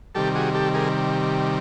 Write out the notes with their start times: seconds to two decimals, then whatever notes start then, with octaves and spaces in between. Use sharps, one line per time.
0.15 C3 D#3 G3 G4 A4
0.35 F#4 G#4
0.54 G4 A4
0.74 G#4 A#4